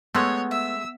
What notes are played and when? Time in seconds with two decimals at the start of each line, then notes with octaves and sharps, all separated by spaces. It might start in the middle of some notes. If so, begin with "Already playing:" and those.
0.15 G#3 A3 B3 C#5 C6 E6 F#6
0.51 E5 E6